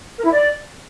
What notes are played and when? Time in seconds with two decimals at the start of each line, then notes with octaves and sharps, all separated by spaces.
0.16 A#4
0.23 E4
0.30 D5